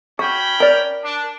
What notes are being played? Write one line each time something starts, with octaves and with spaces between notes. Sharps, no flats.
C#4 F#4 G5 B5
A#4 D5
D4